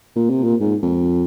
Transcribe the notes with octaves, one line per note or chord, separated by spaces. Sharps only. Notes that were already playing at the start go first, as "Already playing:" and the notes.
A#2
C3
A#2
G#2
F2